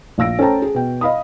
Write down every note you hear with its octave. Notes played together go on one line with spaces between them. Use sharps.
A#1 F5 E6 A#6 D7
C#4 A4 C5 G5 A5 A#5
G#4
B2 G5
D#5 F5 B5 D#6